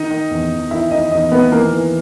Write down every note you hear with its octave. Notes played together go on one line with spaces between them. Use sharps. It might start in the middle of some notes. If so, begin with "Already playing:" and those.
Already playing: D#3 D#4 D#5
D#3
E2
E2
D#3 E4 E5
D#3 D#4 D#5
E2 D#4 D#5
D#3 B3 B4
E3 A#3 A#4
E3